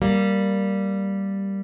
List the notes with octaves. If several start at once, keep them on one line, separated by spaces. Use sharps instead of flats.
G3 A#3